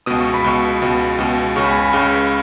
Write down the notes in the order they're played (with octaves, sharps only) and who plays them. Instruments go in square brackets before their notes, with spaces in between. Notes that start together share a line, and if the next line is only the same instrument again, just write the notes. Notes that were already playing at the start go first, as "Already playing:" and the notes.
[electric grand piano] C#2 B2 D#6
C#6
B5
C#2 B2 C#6
C#2 B2
C#2 B2
C#2 C#3 C#6
B5
G#5
B5
C#2 C#3